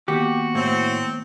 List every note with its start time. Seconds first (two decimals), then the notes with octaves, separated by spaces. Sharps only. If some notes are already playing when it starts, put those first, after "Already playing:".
0.08 D#3 A#3 B3 F#4 G4
0.55 A2 C4